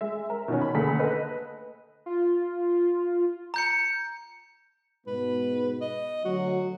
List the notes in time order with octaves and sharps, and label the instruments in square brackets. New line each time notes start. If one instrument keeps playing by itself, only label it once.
[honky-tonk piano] G#3 E5
A#4
B2 D#3 C#4
B5
D2 A#3 G#4 A4 B5 B6
A4 B4 D#5
[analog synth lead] F4
[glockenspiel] A#5 G6 C#7
[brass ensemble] G#2 B2 [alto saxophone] B4
[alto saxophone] D#5
[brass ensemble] D2 F#3 [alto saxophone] F#4